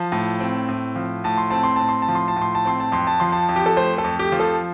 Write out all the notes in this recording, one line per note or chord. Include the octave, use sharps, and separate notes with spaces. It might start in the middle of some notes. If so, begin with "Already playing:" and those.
Already playing: F3 A5
A2
C4
A2
F3
A2 A5
C6
C4 A5
C6
A2 A5
C6
A5
F3
C6
A5
A2
C6
A5
C4 C6
A5
F2 C6
A5
F3 C6
A5
F2
G4
A4
A3 C5
A4
F2
G4
F3
A4